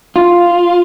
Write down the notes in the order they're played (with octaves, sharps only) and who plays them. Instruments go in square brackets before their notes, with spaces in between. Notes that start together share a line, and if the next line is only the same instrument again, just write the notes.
[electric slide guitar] F4